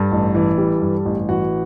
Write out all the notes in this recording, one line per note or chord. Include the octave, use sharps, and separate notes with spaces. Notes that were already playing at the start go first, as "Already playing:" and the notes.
Already playing: G2 A4 A5
A1
E3
G3
G2
A1
E3 F#4 F#5